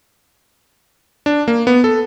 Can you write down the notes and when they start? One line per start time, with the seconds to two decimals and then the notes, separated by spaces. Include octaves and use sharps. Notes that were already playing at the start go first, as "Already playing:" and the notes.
1.26 D4
1.48 A#3
1.67 B3
1.84 A4